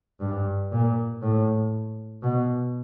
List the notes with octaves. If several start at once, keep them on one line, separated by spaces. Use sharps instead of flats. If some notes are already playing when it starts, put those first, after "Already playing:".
G2
A#2
A2
B2